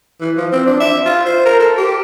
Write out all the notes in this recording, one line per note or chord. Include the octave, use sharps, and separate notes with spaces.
E3
F3
C4
D4
E5
F4
C5
A#4
A4
G4